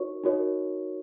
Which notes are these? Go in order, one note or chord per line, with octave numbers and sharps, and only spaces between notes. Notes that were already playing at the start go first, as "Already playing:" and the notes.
Already playing: D#4 F#4 A#4 C#5 C#6
D#4 F#4 A#4 C#5